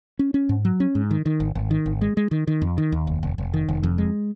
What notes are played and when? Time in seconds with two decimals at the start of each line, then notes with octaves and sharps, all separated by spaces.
0.19 C#4
0.34 C#4
0.49 G#2
0.65 F#3
0.80 C#4
0.95 G#2
1.11 D#3
1.26 D#3
1.40 G#1
1.55 G#1
1.71 D#3
1.86 G#1
2.01 G#3
2.17 G#3
2.31 D#3
2.47 D#3
2.62 F2
2.78 D#3
2.92 D#2
3.07 F1
3.23 F1
3.38 F1
3.54 D#3
3.69 F1
3.83 F2
3.98 G#3